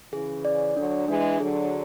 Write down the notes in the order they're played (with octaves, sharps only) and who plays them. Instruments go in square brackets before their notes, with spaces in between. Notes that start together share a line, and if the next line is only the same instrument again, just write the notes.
[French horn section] C#3 E3 [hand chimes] G#4
[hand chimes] D5
[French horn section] D3 F#3 [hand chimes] D4
[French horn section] E3 G#3 [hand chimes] D4
[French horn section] D3 F#3 [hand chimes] G#4